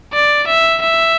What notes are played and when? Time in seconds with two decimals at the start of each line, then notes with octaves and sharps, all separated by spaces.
0.13 D5
0.48 E5
0.82 E5